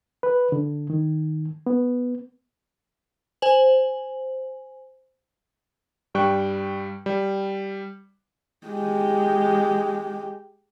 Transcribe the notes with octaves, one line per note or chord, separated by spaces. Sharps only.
B4
D3
D#3
B3
C5 G#5 F#7
G2 G3 G5 C#6 F#6
G3
G#3 G4